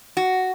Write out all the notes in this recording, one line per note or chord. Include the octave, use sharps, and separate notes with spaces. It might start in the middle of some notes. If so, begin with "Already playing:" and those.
F#4